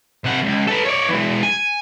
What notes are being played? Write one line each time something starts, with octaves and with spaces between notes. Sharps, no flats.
C3 F#5
C#2
A4 B4
C#5 D5
E3 G#3
G#5